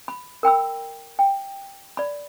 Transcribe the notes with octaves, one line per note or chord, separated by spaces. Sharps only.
B5
A#4 G5 B5 E6
G5
D5 B5